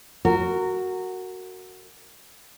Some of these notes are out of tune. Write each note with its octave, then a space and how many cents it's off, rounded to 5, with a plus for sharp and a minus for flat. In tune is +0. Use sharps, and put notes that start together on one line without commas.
F#4 +0 A#4 -20